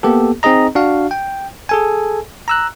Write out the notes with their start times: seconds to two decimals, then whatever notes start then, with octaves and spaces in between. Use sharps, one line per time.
0.03 A#3 B3 G4 A4
0.43 C4 D#4 G#4 D#5 A#5
0.75 D4 F#4 F5
1.11 G5
1.69 G#4 A4 G#5
2.48 A#5 E6 F#6